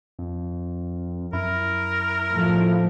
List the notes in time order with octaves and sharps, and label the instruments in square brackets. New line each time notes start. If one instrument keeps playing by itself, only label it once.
[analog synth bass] F2
[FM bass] F#2 [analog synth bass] E4 [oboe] A#4
[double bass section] A2 F3 A3